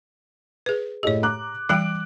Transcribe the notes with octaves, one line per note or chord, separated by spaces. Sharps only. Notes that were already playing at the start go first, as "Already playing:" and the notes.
G#4 B4
A2 G4 G#4 C#5 D#5
A#5 D6 F#6
E3 G3 G5 F#6 D7